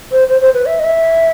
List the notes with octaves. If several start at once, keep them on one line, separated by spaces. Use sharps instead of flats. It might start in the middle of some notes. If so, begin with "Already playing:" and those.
C5
C5
C5
B4
E5
D#5
E5